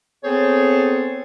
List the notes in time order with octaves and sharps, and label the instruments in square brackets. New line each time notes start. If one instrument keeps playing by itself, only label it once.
[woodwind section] B3 C4 G#4 A4 C5 C#5